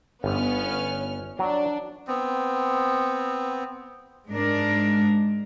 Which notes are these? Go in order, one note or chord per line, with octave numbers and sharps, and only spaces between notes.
G1 B3 C#4 F6
F#3 D4
B3 C4
G#2 G#3 D4 A#4